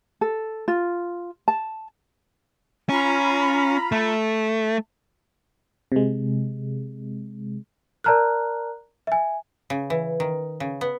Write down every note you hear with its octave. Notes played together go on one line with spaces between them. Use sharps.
A4
F4
A5
C#4 F4 A#5 B5
A3
C3 G#3
A#4 D5 A5 A#5 F6 F#6
E5 G#5
C#3
E3
D#3
C#3
B3